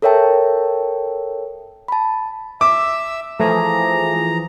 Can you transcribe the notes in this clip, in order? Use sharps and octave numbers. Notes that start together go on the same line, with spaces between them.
A4 A#4 C#5 E5 G5 A5
A5 B5
E5 D6 E6
E3 F3 A3 G#4 A#5